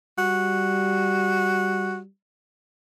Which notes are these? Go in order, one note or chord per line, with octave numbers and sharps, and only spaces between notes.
G3 F#4